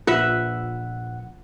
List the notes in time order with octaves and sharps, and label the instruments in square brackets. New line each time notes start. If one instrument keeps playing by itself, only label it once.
[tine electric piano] A#1 F#5 [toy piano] F4 [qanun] B4 E5